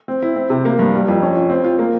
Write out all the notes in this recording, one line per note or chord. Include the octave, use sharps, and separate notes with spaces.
C4
E4
C4
C3
A#3
G2
G3
F2
C#4
F4
C4
F4
A#3